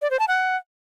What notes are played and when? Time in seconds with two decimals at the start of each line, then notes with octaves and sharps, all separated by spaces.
0.02 D5
0.10 C5
0.19 A5
0.28 F#5